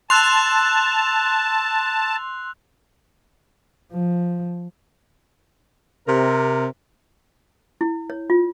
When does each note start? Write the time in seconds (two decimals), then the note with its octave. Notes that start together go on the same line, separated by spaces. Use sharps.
0.10 A5 C6 E6 F#6 F7
3.93 F3
6.06 C3 A#4
7.81 E4
8.10 C#5
8.30 F4